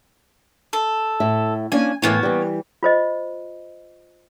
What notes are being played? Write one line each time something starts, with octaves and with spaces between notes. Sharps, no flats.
A4
A2 E5
A#3 C#4 D4 G#5
A2 E3 A#3 B3 E4 C#5
E3 G3
F4 C5 D#5